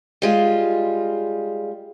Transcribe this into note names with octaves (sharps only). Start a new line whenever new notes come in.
G3 G#3 F4